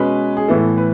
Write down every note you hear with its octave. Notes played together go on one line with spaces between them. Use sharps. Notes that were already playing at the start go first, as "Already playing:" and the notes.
Already playing: B2 G#3 C#4 B4
G#4
A2 E3 B3 E4 A4
B4